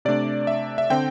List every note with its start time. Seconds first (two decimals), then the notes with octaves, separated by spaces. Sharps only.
0.05 C3 A3 D4 D5
0.47 E5
0.78 E5
0.90 D3 C4 G5